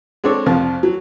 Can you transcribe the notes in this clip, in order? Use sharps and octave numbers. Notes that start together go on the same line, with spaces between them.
G#3 C4 D4 A4 C#5
C2 F2 C3 F3
F#3